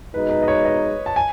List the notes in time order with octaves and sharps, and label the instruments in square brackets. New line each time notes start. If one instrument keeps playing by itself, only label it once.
[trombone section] B2 G#3 D#4 [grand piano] B4
[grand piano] B4
D#5
C#5
D#5
A5
G#5